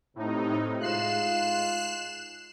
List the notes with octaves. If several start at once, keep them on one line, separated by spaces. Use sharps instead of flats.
A2 C3 D#4
G#2 G#3 F4 F#6 C7 E7